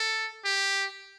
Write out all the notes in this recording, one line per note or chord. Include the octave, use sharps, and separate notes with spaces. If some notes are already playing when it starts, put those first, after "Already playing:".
Already playing: A4
G4